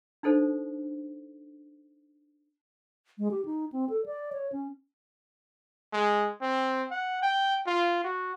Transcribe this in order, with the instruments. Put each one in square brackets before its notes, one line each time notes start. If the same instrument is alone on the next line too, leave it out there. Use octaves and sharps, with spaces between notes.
[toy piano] D4 D#4 A4 C5
[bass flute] G#3
G4
D#4
C4
A4
D5
C#5
C#4
[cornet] G#3
C4
F#5
G5
F4
F#4